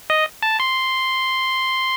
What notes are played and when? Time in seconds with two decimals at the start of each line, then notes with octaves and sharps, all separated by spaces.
0.10 D#5
0.42 A5
0.60 C6